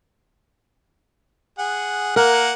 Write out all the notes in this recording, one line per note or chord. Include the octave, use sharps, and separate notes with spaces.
G#4 F#5
A#3 A#4 F#5